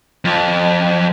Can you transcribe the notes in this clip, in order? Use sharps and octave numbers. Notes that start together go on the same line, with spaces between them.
F2